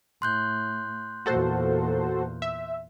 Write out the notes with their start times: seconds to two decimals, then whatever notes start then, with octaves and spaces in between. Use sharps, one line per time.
0.22 A2 C6 F#6 G6
1.26 E2 A#2 F#4 A4 C5
2.42 E5